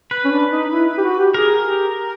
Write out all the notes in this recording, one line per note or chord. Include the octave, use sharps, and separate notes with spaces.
B4
C#4
D4
D#4
E4
G4
F#4
G4
G#4 A#4
G4